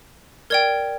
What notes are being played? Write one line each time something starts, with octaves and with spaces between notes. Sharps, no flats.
A#4 D5 G5 G#6